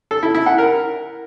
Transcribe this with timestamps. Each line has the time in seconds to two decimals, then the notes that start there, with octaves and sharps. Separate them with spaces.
0.11 A4
0.23 E4
0.35 E4
0.46 F#5
0.58 A#4